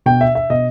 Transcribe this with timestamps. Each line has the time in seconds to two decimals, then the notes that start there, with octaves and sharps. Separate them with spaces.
0.06 B2 G5
0.21 E5
0.35 E5
0.50 B2 D#5